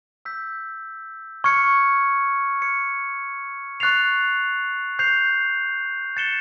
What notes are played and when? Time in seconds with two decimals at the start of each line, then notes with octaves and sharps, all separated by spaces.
0.25 E6 G6 B6
1.44 C#6 F6 G#6 C#7
2.62 C#6 F6 G#6 C#7
3.80 C#6 F#6 A6 C7 F7
4.99 G6 C7 F7
6.17 F#6 A6 C#7 E7 G7